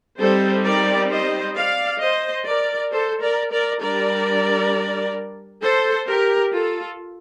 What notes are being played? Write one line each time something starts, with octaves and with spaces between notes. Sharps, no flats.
G3 C4 D#4 A4 C5
A#4 D5
C5 D#5
D5 F5
C5 D#5
A#4 D5
A4 C5
A#4 D5
A#4 D5
G3 D4 A#4 D5
A4 C5
G4 A#4
F4 A4